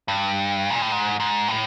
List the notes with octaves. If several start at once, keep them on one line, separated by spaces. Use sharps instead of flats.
G2
A#2
A2
G#2
G#2
A2